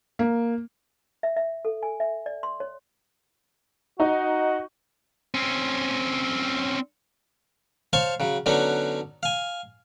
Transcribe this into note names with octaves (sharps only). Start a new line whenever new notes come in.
A#3
E5
E5
A4
G#5
E5
D5
C6
C#5
D#4 F#4
C4 C#4
C5 C#5 F5 A5 C6 C#6
C#3 F#3
D3 F#3 B3 C#4 D#4
F5 G#5